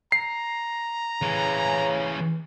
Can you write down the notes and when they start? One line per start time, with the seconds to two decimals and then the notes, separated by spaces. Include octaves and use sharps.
0.12 A#5 C7
1.22 C#3 E3 C#4